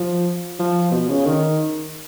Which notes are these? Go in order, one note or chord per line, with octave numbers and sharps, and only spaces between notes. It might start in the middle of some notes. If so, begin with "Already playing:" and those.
Already playing: F3
F3
B2
C#3
D#3